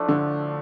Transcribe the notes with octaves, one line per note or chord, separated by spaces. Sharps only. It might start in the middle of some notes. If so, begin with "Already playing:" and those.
Already playing: A2 F3 A3 D4
D3